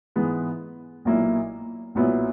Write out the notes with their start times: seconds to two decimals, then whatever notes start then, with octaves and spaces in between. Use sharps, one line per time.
0.16 G#2 E3 G#3 B3
1.05 B1 A#2 A#3 E4
1.95 B1 A#2 F#3 B3 E4